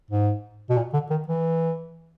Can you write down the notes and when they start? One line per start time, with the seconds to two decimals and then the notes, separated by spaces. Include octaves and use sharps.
0.10 G#2
0.70 B2
0.77 A#2
0.94 D3
1.10 D#3
1.28 E3